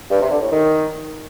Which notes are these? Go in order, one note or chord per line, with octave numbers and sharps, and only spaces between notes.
G2
C3
D3
A2
D#3